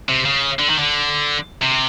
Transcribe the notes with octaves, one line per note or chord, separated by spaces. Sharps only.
C3
C#3
D3
D#3
D3
C3